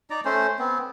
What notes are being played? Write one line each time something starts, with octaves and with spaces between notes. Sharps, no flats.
D#4 D5 A#5
A3 C#4 C5
B3 C4